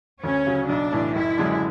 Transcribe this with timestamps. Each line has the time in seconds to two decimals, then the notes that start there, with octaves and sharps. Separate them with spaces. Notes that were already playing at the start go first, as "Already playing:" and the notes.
0.24 D2 C#4
0.46 C#3 F#3
0.69 B1 D4
0.92 A2 E3
1.15 F#1 E4
1.38 F#2 D3 G#3 D4